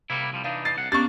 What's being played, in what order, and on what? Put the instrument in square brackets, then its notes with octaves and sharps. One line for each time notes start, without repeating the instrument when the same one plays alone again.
[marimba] C3 [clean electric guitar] G3 A#3 E4
[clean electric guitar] C2 F3 G3
[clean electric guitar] E3 D4 D#4 [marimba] F5
[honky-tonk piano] A6 C7
[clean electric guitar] C2 F#5
[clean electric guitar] A#3 D4 [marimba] B3 C#4 G4 [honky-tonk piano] C#6 A6